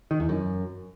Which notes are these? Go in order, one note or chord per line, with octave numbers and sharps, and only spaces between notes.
D#3
E2
F#2